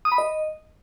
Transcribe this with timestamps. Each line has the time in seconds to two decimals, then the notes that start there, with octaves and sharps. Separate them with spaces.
0.05 D#6
0.12 B5
0.18 D#5